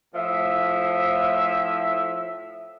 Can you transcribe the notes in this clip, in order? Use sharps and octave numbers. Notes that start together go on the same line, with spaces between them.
A2 F3 E5